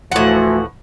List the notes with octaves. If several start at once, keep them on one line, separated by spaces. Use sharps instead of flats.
D2 A2 E3 F3 F#5